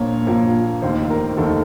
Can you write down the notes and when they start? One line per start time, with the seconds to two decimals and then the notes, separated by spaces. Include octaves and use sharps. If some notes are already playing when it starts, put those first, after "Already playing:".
Already playing: A#1 A#2 F3 A#3 C#5
0.27 A#1 A#2 F3 A#3
0.82 F1 D#2 D#3 C5
1.10 A#4
1.37 F1 D#2 D#3 A4